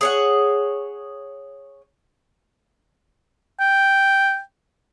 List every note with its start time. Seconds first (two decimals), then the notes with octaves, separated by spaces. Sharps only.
0.01 G#4 C#5 F#5
3.60 G5